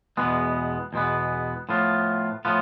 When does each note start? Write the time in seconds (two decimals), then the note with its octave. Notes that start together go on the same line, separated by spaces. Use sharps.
0.17 E2 B2 G#3 B3
0.93 E2 B2 G#3 B3
1.69 A2 F3 B3 F4
2.45 A2 F3 B3 F4